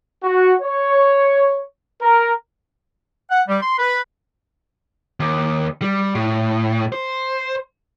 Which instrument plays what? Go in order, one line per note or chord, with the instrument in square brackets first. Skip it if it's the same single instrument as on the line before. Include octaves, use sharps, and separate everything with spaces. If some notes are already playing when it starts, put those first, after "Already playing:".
[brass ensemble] F#4
C#5
A#4
[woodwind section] F#5
G3
C6
B4
[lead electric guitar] D#2
G3
A2
C5